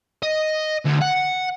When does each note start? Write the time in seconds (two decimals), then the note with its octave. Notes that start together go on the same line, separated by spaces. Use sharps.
0.23 D#5
0.86 D2
1.02 F#5